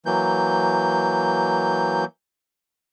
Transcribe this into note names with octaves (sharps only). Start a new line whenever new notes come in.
E3 F#3 A#3 G6